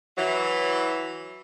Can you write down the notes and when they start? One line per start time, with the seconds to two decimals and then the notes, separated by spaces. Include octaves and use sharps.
0.17 E3 F#3